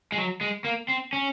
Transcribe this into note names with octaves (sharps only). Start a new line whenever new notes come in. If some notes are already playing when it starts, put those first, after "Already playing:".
G#3
F#3
G#3
A#3
C4
C#4